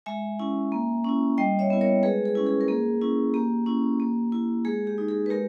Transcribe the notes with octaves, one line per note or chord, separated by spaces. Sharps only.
G#3 E5 G#5
C#4 E4
A#3
C#4 E4
G3 D#5 G5
C#5 E5
B3 E4
A#4 C#5
G#3 G#4 B4
G#4
C#4 E4
G#4
A#4
A#3 G#4
C#4 E4
A#3 G4
C#4 E4
A#3
E4
G#3 G#4
G4
D#4
G#4
B4
G#3 G4 A#4